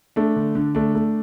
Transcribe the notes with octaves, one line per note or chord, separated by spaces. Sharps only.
A3 D4
D3
D3
A3 D4
A3